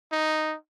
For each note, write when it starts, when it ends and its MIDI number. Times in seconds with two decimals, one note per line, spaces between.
0.12 0.56 63